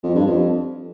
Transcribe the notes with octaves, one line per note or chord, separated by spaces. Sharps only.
F2
G2
F2